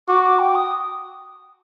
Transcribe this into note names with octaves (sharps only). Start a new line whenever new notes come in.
F#4 D6
D6
G5
D#6